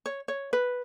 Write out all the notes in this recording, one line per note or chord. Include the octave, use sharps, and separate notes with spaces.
C#5
C#5
B4